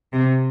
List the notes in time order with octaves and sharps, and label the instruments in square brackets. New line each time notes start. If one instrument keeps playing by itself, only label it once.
[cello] C3